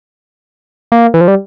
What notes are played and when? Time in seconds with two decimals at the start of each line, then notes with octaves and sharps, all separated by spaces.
0.92 A#3
1.14 E3
1.21 F3
1.28 G3